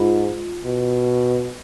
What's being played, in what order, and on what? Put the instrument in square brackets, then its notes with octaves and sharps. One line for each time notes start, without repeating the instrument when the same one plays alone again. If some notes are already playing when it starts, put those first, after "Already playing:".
Already playing: [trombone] G#2 [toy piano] F4
[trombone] B2